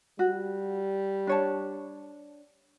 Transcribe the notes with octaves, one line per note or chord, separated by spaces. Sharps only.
G3 F#4
D4 C#5 A5